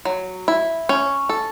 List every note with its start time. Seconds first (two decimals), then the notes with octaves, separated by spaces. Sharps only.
0.05 F#3
0.48 E4
0.89 C#4
1.29 A4